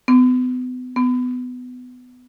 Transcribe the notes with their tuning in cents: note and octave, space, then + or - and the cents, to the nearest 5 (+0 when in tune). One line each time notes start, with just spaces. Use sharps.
B3 +35
B3 +20